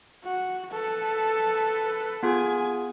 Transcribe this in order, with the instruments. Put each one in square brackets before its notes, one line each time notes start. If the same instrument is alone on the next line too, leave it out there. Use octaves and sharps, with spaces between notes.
[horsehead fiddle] F#4
A4 B4
[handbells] B3 F4 G#4 [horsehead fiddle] G#5